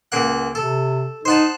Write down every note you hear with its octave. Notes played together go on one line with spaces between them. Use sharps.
C#2 A#3 F#5
C3 A4
D#4 C5 F#5 A5